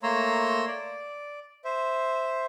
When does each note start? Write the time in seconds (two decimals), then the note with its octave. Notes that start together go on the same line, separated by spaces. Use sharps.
0.03 A3 A#3 C#5 A#5 C6 E6
0.67 D5
1.65 C5 E5